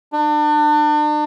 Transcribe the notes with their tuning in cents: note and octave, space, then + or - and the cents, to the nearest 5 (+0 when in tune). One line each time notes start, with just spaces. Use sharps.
D4 +35